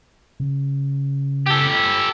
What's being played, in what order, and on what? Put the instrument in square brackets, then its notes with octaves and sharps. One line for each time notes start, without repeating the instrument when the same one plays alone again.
[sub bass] C#3
[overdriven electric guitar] G4 A4